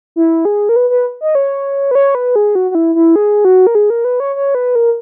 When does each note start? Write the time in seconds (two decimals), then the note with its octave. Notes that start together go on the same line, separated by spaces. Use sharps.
0.16 E4
0.45 G#4
0.69 A#4
0.76 B4
0.90 B4
1.21 D#5
1.35 C#5
1.91 B4
1.95 C#5
2.15 B4
2.36 G#4
2.55 F#4
2.71 F#4
2.75 E4
2.95 E4
3.16 G#4
3.45 F#4
3.67 A#4
3.75 G#4
3.90 A#4
4.05 B4
4.20 C#5
4.36 C#5
4.55 B4
4.75 A#4